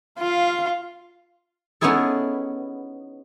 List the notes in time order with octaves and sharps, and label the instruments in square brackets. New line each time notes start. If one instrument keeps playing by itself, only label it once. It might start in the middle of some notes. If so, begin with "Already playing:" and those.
[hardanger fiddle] F4 [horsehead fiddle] F5
[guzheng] B3 C#4 D#4 E4 G#4 A4